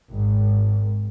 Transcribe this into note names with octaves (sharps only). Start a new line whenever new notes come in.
G#1